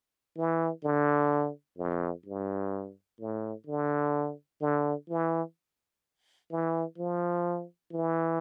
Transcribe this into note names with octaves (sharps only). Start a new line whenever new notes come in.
E3
D3
F2
G2
A2
D3
D3
E3
E3
F3
E3